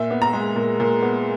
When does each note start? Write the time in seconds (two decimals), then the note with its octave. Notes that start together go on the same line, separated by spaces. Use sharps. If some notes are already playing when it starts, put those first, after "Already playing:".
Already playing: A#2 E5
0.11 B3
0.22 A#5
0.33 G#3
0.56 A#2
0.80 A#2
1.03 B3